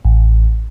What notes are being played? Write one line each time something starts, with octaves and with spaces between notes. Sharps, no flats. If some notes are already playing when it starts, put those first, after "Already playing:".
A1